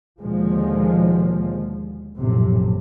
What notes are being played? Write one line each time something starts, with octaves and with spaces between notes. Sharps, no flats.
D#2 B2 D3 F3 G#3
A#1 F#2 A2 C3